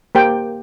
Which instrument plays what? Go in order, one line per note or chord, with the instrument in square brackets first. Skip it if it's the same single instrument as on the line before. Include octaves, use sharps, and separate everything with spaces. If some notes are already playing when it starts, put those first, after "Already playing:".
[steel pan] A#3 G4 C5 G5